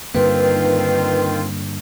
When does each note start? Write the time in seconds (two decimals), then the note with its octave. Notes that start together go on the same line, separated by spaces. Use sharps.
0.14 G2 D3 D#3 A#3 C4 F4 B4